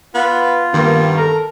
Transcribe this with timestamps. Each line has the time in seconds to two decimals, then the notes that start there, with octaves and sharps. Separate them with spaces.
0.14 B3 F4
0.74 G2 D#3 A#3 B3
1.17 A4 A#4 A#5